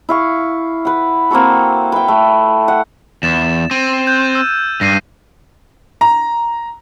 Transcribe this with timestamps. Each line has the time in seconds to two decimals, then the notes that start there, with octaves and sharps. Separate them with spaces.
0.09 E4 F5 C#6
0.85 B4 F#5
1.31 A#3 C4 F#4 A4
1.92 B4 G5
2.08 A3
2.68 F#5
3.23 E2 A6 E7
3.71 C4 D#7
4.07 F#6 G6
4.35 E6
4.81 G2 A#6 C7 D#7
6.01 A#5